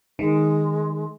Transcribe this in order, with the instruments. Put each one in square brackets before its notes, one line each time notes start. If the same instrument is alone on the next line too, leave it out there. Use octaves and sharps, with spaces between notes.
[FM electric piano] D#3 [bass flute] G#3